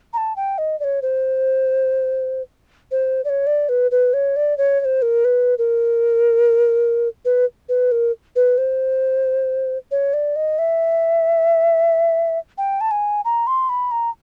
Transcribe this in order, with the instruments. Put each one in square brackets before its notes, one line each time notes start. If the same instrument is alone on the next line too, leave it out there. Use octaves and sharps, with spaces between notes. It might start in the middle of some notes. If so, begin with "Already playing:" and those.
[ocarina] A#5
A5
G5
D#5
D5
C#5
C5
C5
D5
C#5
D5
B4
B4
C#5
D5
C#5
C#5
C5
A#4
B4
A#4
B4
B4
A#4
B4
C5
C#5
D5
D#5
E5
G5
A5
G#5
A#5
C6
B5
A#5